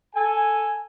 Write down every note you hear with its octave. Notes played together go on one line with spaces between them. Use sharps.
A4 G#5